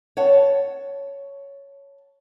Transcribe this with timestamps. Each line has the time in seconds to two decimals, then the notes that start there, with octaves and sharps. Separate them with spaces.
0.17 C#5 F#5 A5